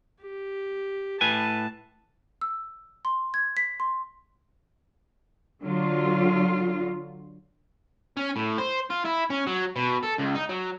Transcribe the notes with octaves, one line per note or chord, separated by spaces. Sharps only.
G4
A2 B4 G#5 A5
E6
C6
G#6
B6
C6
D3 F#3 F4
C#4
A2
C5
F4
E4
C#4
F#3
B2
A4
C#2
D#4
F#3